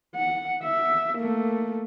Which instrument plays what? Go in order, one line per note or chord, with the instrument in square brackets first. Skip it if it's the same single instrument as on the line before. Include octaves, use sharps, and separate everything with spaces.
[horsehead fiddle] F#5
E5
A3 A#3